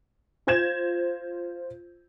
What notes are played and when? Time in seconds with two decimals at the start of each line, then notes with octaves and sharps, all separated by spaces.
0.47 F4 C5 G6 G#6 A#6 E7